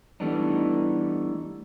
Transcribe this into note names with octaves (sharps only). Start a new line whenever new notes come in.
E3 G3 A3 B3 D4 D#4